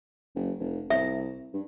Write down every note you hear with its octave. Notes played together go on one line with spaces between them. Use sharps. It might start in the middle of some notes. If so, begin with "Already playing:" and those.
F#1
F1
C2 E5
G2